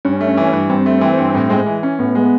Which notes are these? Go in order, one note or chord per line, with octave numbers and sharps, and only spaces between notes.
G2 C#4
A3
E3
G2
G2 C4
A3
E3
G2
A2
G#3
E3
C#4
A2 B3
G#3